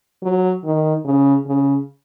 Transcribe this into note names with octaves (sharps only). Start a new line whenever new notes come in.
F#3
D#3
C#3
C#3